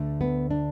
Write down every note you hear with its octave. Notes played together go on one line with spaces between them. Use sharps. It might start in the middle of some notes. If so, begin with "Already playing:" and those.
Already playing: D2 D3 A3
B3
D4